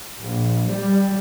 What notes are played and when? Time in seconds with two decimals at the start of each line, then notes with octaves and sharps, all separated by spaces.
0.20 A#1
0.71 G3